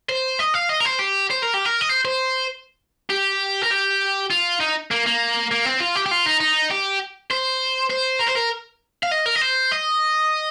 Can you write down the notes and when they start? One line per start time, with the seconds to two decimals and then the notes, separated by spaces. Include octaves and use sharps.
0.09 C5
0.39 D#5
0.54 F5
0.69 D#5
0.80 A#4
0.85 C5
0.99 G4
1.30 C5
1.42 A#4
1.54 G4
1.65 A#4
1.81 D#5
1.89 C5
2.05 C5
3.10 G4
3.63 A#4
3.71 G4
4.30 F4
4.60 D#4
4.91 A#3
5.06 A#3
5.51 A#3
5.65 C4
5.80 F4
5.96 G4
6.06 G4
6.11 F4
6.26 D#4
6.41 D#4
6.71 G4
7.31 C5
7.90 C5
8.21 A#4
8.29 C5
8.37 A#4
9.03 F5
9.12 D#5
9.26 A#4
9.36 D#5
9.42 C5
9.72 D#5